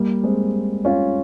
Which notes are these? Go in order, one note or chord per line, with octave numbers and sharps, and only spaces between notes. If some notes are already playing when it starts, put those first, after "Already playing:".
Already playing: G3 A#3
G#3 C4
C#4 F4